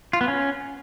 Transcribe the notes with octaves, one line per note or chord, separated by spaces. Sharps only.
F4
B3
C#4